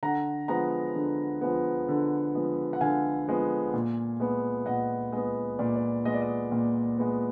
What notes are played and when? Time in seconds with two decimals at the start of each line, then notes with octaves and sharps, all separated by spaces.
0.03 D3 F#5 A#5
0.48 F3 G#3 B3 F#5 A#5
0.95 D3
1.41 F3 G#3 B3
1.89 D3
2.34 F3 G#3 B3
2.73 F#5
2.81 D3 F5 G#5
3.27 F3 G#3 B3
3.73 A#2
4.20 G#3 B3
4.66 A#2 D#5 F#5
5.12 G#3 B3 D#5
5.59 A#2 D5
5.76 D5
6.05 G#3 B3 D#5
6.14 D5
6.22 D#5
6.52 A#2
6.98 G#3 B3